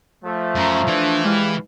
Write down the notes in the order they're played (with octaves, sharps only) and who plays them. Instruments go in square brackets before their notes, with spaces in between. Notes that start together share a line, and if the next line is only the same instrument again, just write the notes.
[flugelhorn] F3 [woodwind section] A3
[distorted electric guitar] F#2 [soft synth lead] A#5
[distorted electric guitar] E3 [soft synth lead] D4
[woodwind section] G3 E4 F5 [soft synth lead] G#3